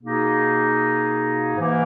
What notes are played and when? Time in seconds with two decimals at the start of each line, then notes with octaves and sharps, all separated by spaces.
0.03 B2 A#3 D#4 G#4
1.57 G#2 E3 A#3